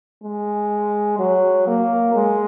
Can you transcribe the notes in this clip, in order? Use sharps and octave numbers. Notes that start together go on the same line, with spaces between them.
G#3
F#3
A#3
G#3